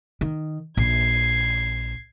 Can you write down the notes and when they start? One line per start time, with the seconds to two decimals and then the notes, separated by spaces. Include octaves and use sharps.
0.21 D#3
0.77 A#1 G#6 C7